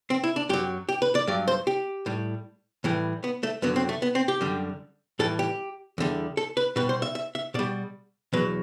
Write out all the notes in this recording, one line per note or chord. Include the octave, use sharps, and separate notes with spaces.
C4
E4
D4
F#2 F#3 G4
G4
B4
D5
G2 F#3 D5
C5
G4
A2 G3
A2 E3 G3
B3
A3
F#2 D3 F#3 B3
C4
A3
B3
C4
G4
F#2 D3 G3
A2 E3 G3 A4
G4
E2 D3 G3
A4
B4
B2 G3 B4
C5
E5
E5
E5
B2 G3 D5
E2 B2 F#3 B4